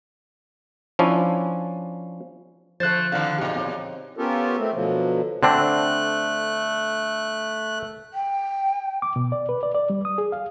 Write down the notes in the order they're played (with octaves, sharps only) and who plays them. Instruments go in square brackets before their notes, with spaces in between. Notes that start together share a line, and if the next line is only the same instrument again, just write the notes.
[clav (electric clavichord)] F3 C#4 D4 E4
[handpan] D3 F3 [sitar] A3 C5 [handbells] F#6 A6
[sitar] D3 D#3 [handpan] C4 F5
[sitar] E2 A#2 [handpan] D#4 G4
[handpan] C4 C#5
[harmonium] B3 C#4 F4 G4 A4 A#4
A3 C4
B2 D3 F3 F#3
[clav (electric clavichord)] D3 C4 D4 [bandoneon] A3 F#6
[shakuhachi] G5
[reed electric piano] D6
B2
D5
B4
D5
D5
G3
D#6
G#4
F5